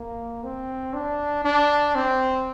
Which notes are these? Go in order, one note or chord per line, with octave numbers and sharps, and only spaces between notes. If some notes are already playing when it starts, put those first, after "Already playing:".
Already playing: A#3
C4
D4
D4
C4